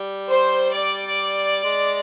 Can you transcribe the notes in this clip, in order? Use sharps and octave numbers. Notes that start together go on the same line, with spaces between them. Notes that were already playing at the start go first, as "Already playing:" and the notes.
Already playing: G3
C5
D5
G#3